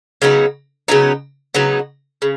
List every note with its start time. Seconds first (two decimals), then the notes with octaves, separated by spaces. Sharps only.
0.22 C#3 F#3 B3 D#4
0.88 C#3 F#3 B3 D#4
1.54 C#3 F#3 B3 D#4
2.22 C#3